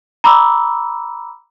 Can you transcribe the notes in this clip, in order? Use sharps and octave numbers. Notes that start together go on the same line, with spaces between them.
A#5 B5 D6 E6